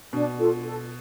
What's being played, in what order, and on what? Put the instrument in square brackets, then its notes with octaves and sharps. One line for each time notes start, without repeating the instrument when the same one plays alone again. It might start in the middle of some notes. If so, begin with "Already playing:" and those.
[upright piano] B2 [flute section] D4
[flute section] F4 A4
A4